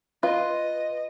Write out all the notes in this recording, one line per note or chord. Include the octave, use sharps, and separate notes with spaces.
F4 B4 D#5